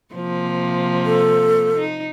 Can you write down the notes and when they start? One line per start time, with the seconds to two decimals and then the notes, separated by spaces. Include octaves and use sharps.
0.15 C3 F3 A#3
1.06 A4
1.77 D#4